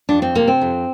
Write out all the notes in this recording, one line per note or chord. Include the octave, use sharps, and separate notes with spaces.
F2 D4
C4
C3 A#3
C4
F2